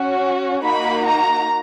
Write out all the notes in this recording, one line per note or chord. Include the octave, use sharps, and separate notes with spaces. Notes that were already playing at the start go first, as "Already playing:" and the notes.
Already playing: C#4 F#4
A#3 D#4 F#4 B5
A#5